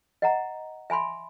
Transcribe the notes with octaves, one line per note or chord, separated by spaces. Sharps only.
D#5 F#5 A#5
E5 G#5 B5 C6